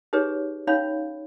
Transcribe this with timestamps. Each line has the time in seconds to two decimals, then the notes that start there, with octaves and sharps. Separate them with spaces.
0.13 D#4 G4 G#4 B4 C#5
0.67 C#4 D#4 C#5 F5 B5